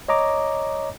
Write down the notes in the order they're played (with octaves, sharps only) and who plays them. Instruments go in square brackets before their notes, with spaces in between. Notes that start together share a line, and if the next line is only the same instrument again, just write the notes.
[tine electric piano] C#5 D#5 A#5 D6